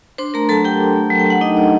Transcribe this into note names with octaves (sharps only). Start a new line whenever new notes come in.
D4 C5 C6
A3 A#4 A#5
F#3 A4 A5
F#3 G4 G5
D4
A3
F#3
G5
F#3 F#5
D4 D#4 D#5
A3